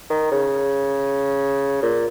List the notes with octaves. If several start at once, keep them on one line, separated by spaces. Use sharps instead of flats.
D#3
C#3
A#2